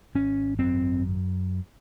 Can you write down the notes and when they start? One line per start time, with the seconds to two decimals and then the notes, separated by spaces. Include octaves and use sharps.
0.15 G#1 C#4
0.59 F#2 C4